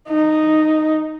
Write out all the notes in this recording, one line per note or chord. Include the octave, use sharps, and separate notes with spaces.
D#4